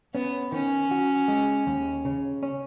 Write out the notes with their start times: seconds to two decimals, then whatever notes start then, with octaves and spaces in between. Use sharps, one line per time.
0.15 B3 C#4
0.52 D#3 C#4
0.91 F#4
1.28 G#3
1.67 D#2
2.05 C#3
2.43 C#4